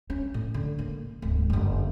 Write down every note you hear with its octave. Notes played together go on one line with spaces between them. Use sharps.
C#4
A2
D3
A#3
D1 G#2
F#1 D3